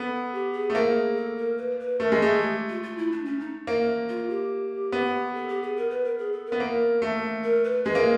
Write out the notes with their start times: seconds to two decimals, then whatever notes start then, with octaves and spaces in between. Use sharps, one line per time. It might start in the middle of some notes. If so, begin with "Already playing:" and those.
Already playing: B3 A4
0.33 G4
0.53 G#4
0.70 A3
0.75 A#3
1.16 A4
1.37 A#4
1.58 B4
1.80 B4
1.99 A3 A#4
2.12 G#3
2.21 A3 G#4
2.41 G4
2.69 F4
2.83 F4
2.98 E4
3.12 D4
3.25 C#4
3.40 D#4
3.67 A#3
4.09 F4
4.29 G4
4.92 B3
5.34 A4
5.49 G4
5.62 G#4
5.76 A#4
5.90 B4
6.05 A#4
6.18 G#4
6.32 A4
6.46 A#4
6.52 B3
6.60 A#3
7.02 A3
7.43 A#4
7.64 B4
7.85 G#3 B4
7.95 A#3